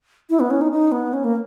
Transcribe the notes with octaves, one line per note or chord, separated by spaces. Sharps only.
E4
B3
C#4
D#4
D#4
B3
C#4
A#3